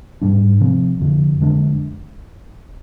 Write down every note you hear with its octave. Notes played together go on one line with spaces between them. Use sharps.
G#2 G3 D4
C3 F3 C4
F2 D3 F3
F2 D3 G#3 D4